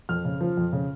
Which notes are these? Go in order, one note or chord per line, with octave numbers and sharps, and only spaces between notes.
F2 F6
C#3
F3
F2
C#3